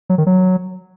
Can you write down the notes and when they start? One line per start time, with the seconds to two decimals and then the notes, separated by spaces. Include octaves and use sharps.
0.10 F#3
0.18 D#3
0.27 F#3